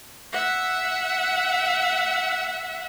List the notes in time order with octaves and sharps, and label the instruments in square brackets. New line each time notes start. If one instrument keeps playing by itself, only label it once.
[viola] E5 F#5